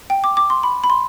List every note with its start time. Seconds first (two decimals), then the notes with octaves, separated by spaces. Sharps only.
0.10 G5
0.24 D6
0.37 D6
0.50 C6
0.63 B5
0.84 B5
0.90 C6